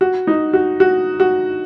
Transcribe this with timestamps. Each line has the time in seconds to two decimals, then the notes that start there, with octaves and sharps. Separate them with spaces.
0.01 F#4
0.27 D#4
0.53 F#4
0.80 F#4
1.20 F#4